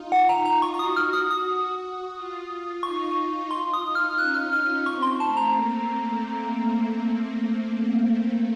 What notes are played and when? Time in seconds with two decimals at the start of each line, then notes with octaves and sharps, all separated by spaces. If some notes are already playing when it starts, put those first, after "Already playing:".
Already playing: D#4 F4
0.12 F4 F#5
0.29 A#5
0.45 A#5
0.62 C#6
0.74 C#6
0.79 F#4 D#6
0.97 F6
1.13 D#6
1.31 D#6
2.15 F4
2.83 D#4 C#6
3.17 F4
3.50 F4 C6
3.74 D#6
3.84 D#4
3.95 F6
4.18 C#4 F#6
4.35 F6
4.53 F6
4.86 C4 C#6
5.02 C6
5.20 A3 A5
5.37 A#5
5.53 A#3